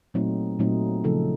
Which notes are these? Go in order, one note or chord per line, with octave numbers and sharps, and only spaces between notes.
A#2 F#3 A3 C4 D#4
A#2 F#3 A3 C4 D#4
C#3 F3 A3 D#4 A4